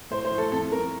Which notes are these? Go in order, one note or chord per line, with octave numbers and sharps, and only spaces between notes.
A2 C5
C5
A2
A4
F2 A4
F2 A#4